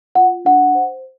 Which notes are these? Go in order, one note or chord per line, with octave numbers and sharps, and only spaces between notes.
F4 F#5
D4 F#5
C5